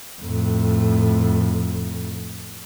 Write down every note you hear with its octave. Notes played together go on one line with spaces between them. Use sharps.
F2 A2